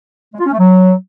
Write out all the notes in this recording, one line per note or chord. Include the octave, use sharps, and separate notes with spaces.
G#3
F4
C#4
A3
F#3